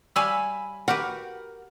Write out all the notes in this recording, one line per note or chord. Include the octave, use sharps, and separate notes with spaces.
G3 C#5 F5 G#5 B5 E6
F#4 G4 A#4 B4 F#5